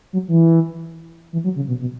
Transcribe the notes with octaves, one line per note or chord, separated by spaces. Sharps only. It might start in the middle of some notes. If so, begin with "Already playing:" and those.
F#3
E3
E3
F#3
C#3
B2
B2